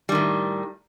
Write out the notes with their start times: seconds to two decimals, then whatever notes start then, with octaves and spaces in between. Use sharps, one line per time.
0.09 G3
0.12 D#3
0.15 A2